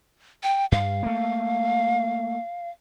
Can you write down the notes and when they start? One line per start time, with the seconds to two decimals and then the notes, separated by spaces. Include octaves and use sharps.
0.43 G5
0.72 G2 F5
1.03 A3 A#3